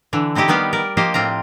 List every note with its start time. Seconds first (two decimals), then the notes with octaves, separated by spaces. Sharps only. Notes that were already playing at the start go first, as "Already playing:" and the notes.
0.13 D3 E3
0.35 C4 D#4 E4 G4 D#5
0.48 D#3 G3 B3 G4 F5
0.73 A#4 D5
0.97 F3 A#3 G4 C5 D#5 F5
1.14 A2 C4 F4 A#5